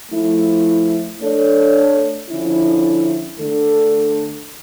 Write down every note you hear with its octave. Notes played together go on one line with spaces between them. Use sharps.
F3 A3 E4
A3 D4 A4 C#5
D3 F3 C#4 E4
D3 A3 D4 A4